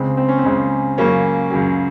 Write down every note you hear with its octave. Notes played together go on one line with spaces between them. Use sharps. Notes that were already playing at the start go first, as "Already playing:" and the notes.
Already playing: C#2 C#3 G#3 C4
C4
C#4
C4
C#2 C#3 G#3
C#2 C#3 F#3 A#3 C#4
C#2 C#3 F#3